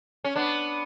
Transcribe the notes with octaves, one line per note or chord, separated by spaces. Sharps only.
C#4
B3 D4